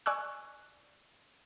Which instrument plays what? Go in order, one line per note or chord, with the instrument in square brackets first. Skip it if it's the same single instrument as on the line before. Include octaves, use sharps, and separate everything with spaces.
[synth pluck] D5 G#5 C#6 E6 F#6